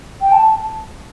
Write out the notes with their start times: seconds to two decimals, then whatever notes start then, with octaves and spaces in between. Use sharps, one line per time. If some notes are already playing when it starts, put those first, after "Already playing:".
0.21 G5
0.32 A5